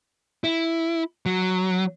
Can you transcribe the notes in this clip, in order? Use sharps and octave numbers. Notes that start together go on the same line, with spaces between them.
E4
F#3